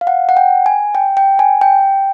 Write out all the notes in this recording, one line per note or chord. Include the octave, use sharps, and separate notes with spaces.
F5
F#5
F#5
G5
G#5
G5
G5
G#5
G5